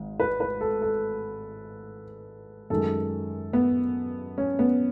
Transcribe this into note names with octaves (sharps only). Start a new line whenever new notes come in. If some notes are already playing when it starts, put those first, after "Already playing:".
Already playing: G#1 G#2
B4
B4
A4
A4
F#2 D#3 G#3 A4
B3
C#4
B3